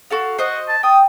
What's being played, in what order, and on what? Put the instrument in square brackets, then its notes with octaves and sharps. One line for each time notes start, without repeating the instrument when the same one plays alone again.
[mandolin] F#4 A4 F5
[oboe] F#4 [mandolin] C5 D#5
[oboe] A5
[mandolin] G5 [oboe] D#6